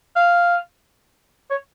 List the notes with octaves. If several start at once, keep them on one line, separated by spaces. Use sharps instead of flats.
F5
C#5